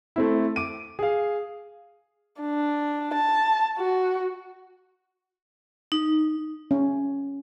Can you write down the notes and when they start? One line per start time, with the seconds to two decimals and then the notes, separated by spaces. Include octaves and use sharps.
0.16 A3 C4 E4
0.56 D6 D7 D#7
0.99 G#4 F5
2.42 D4
3.14 A5
3.78 F#4
5.92 D#4
6.71 C#4